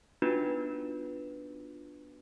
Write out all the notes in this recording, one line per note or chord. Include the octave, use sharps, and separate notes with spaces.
B3 D4 D#4 F4 F#4 B4